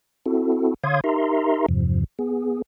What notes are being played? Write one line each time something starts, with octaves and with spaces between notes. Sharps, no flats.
C4 E4 F#4 A4
D3 C#5 F5 C6 D#6 G#6
D#4 G4 A#4 E5 A#5 C6
E2 G2 C3 F3
B3 G#4